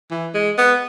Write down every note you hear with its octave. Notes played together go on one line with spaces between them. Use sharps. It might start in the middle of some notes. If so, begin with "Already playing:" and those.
E3
G#3
B3